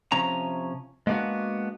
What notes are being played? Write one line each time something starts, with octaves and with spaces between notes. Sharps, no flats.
C3 F3 C#4 A#5
G#3 A#3 B3 D4 F#4